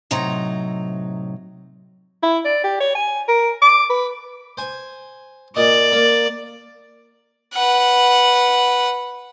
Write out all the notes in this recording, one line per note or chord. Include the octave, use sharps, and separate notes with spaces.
A2 C3 F#3 D#4 A#5
E4
D5
G4
C#5
G#5
A#4
D6
B4
C5 G#5
A#2 D5 D#5
A#3
B4 F#5